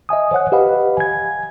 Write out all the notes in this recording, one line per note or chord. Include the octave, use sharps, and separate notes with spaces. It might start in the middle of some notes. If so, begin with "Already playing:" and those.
D#5 E5 G#5 D#6
C5 C#5 F#5 F#6
G4 B4 D#5 F5 F#5 B5
G#5 G#6